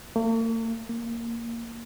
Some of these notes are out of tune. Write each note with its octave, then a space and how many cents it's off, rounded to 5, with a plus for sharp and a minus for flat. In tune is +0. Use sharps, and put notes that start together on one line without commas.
A#3 -45
A#3 -5